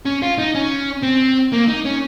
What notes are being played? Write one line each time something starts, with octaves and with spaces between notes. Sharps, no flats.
C#4
F4
D#4
C#4
C4
A#3
D#4
C#4